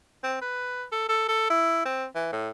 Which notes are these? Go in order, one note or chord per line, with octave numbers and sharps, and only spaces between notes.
C4
B4
A4
A4
A4
E4
C4
E3
A2